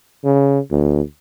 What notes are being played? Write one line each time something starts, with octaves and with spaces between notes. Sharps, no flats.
C#3
D2